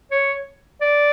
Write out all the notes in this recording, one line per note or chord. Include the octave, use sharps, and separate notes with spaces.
C#5
D5